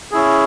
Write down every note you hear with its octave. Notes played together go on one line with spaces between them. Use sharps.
C#4 E4 G#4